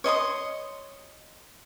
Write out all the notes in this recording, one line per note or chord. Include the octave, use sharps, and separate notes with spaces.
C#5 D#5 C6 D#6